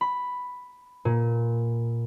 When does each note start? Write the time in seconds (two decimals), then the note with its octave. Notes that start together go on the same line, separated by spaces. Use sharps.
0.01 B5
1.05 A#2